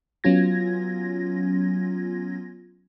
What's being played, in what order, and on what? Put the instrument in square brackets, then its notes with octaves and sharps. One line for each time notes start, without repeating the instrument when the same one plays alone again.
[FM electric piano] F#3 B3 C#4 F4 G#6 A#6